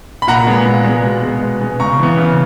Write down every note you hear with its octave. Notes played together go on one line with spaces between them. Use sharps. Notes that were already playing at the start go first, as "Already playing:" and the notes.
B5
A#2 F#5 A#5
G#3 B3
A#2
G#3 B3
B2
G#3 B3
B2
G#3 B3
C#3 A#5 C#6
E3 B3
C#3